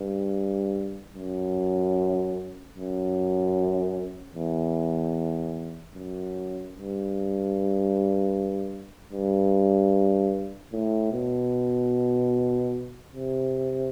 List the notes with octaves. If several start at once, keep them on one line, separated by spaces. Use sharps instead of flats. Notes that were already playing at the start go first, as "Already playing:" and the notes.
Already playing: G2
F#2
F#2
E2
F#2
G2
G2
A2
B2
C3